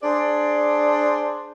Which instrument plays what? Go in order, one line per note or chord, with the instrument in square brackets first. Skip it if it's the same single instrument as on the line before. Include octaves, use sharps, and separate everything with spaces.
[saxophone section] D4 G#4 C5 D5